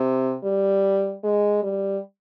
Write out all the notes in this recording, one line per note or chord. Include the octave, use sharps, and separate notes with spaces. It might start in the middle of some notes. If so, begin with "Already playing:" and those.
Already playing: C3
G3
G#3
G3